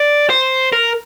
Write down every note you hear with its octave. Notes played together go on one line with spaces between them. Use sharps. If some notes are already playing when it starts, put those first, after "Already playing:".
Already playing: D5
C5
A#4